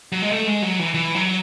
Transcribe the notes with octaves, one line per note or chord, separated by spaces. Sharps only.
F#3
G#3
A3
G#3
F#3
E3
E3
F#3